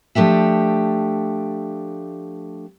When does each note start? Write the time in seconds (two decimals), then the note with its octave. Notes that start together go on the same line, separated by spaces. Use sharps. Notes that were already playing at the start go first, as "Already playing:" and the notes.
0.15 F3 A3 D4 G4 E5